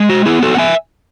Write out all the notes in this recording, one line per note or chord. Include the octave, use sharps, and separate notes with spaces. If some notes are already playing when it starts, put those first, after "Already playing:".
Already playing: G#3
F#4
B3 E4 G#4
F#4 A4
F#5
E5 G#5